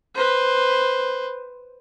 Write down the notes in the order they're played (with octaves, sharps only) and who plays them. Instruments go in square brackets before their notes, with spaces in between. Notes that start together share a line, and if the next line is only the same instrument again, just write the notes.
[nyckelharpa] B4 C5